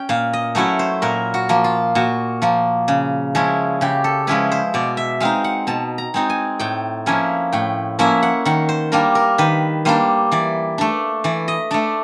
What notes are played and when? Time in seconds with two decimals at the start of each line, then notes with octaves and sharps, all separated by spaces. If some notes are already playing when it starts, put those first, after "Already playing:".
Already playing: C#4 G5
0.09 A#2 F5
0.33 D#5
0.55 F#3 A3 C#4 E4 C#5
0.79 C5
1.02 A#2 A#4
1.34 F#4
1.49 F3 A#3
1.64 F4
1.95 A#2 F#4
2.42 F3 A#3
2.88 C#3
3.35 F3 G#3 C#4 E4
3.81 C#3 G4
4.04 A4
4.27 F3 G#3 C#4 E4 B4
4.52 C5
4.74 B2 D5
4.97 E5
5.20 G#3 C4 D#4 F5
5.44 F#5
5.67 B2 A5
5.98 A#5
6.14 G#3 C4 D#4
6.30 G#5
6.59 A2 G5
7.06 F3 A#3 C#4 E4 G#5
7.52 A2 G5
7.99 F3 A#3 C#4 E4 E5
8.23 F#5
8.45 D#3 F#5
8.69 C5
8.92 G3 A#3 D4 A#4
9.15 A#4
9.38 D#3 B4
9.85 G3 A#3 D4 C5
10.32 E3 D5
10.78 A3 D4
11.24 E3 D5
11.48 D#5
11.71 A3 D4 D5